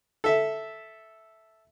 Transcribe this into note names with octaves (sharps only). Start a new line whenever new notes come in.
A4 E5